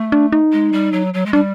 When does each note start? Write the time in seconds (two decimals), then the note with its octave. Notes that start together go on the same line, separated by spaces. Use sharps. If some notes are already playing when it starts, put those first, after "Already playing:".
Already playing: A3
0.12 D4
0.32 D#4
0.52 G#3
0.73 G3
0.93 F#3
1.14 F#3
1.26 G#3
1.33 G3 D4